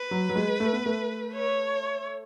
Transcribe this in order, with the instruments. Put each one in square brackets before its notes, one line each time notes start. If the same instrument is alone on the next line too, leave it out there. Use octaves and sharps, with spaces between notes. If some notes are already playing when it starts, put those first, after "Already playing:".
Already playing: [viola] B4
[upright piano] F#3
F#3
G#3
A3
B3
A3
[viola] C#5